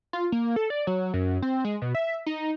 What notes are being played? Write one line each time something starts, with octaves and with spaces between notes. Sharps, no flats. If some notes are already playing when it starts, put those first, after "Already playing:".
F4
A#3
A4
D5
F#3
F#2
C4
G#3
B2
E5
D#4